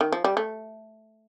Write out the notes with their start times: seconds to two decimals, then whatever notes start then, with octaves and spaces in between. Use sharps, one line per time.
0.01 D#3
0.12 F3
0.24 G3
0.37 A3